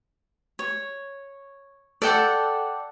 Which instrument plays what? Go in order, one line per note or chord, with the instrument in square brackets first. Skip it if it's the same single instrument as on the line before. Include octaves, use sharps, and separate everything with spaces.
[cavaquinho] C#5
[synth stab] A4 F#5 [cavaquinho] D5 G5 A5